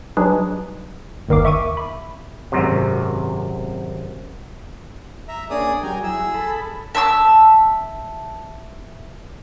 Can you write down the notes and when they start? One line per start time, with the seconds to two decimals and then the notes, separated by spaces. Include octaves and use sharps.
0.17 F#3 G3 D4 D#4 G#4 B4
1.29 G1 D#2 D#3 A#4 F5 D6
1.45 E5 C#6 D6 D#7
1.77 B5
2.52 G#1 F#2 C3
5.28 E5 A#5
5.50 A#3 C#4 D4 G#4 D5 D#6
5.83 F#3 G3 G5 G#5 A#5
6.03 F#3 E4 G#4 E6
6.34 A4 B5
6.95 E5 A5 B5 E6